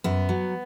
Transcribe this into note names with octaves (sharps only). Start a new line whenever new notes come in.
F#2 B3
F#3